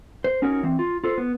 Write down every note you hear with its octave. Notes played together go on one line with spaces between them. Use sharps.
C5
C#4 D#4 F#4 A#4 C#5
E3 C4
F4
F4 A4 C5
B3